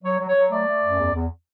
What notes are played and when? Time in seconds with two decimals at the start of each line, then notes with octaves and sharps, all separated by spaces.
0.03 F#3 C#5
0.19 F#3
0.28 C#5
0.35 F#3
0.51 A3 D5
0.67 A3
0.83 F#2
0.99 E2
1.14 E2